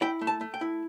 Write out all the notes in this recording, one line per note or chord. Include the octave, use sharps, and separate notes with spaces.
E4 G5
A3
A5
A3
G5
E4